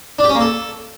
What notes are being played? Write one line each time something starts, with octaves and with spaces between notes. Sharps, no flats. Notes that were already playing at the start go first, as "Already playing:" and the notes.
D4
G4
C#4
A#3
A4